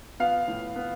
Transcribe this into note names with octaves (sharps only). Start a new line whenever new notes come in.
B3 F5
A2
B3